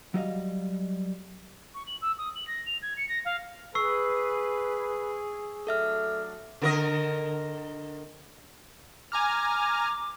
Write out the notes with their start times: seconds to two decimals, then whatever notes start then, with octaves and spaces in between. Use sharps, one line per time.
0.14 F#3 G3 D#5 F5
1.74 C#6
1.87 F#7
2.02 E6
2.18 D#6
2.35 F#7
2.47 A#6
2.66 F7
2.82 G#6
2.97 C#7
3.09 A#6
3.25 F5
3.75 G#4 B4 C#6 E6 C7
5.67 F#3 A3 D4 A4 E5 F6
6.62 D3 A#4 D#5
9.12 G#5 A#5 D6 F6